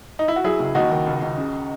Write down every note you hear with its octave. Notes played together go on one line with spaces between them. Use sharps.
D#4
E4
F#4
F#3 E4 G#4
C#2
D#2 D#4 F#4
D#3
C#2
C#2
C#3